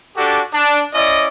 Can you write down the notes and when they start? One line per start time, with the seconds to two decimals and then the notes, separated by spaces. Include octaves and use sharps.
0.15 D4 F#4 G4 A4
0.53 D4
0.93 C#4 E4 D5 D#5